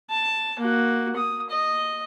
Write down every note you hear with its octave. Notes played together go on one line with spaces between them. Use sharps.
A5
A#3 F#4
A#3 D#6
D#5